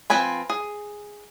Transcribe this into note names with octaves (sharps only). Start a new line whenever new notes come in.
F3 C4 B4 G#5 B5
G#4